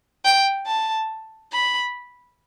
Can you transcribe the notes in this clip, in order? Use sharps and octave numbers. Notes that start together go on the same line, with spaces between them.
G5
A5
B5